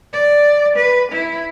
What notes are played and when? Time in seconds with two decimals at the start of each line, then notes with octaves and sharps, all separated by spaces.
0.13 D5
0.76 B4
1.12 E4